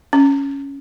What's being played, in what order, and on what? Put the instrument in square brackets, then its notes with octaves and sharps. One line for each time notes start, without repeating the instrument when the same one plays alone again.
[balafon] C#4